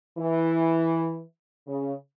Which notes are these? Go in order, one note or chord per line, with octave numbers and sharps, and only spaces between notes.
E3
C#3